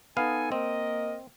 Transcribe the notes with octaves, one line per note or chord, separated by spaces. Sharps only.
B3 D#4 A4 F5 G#5
A#3 C4 A#4 D#5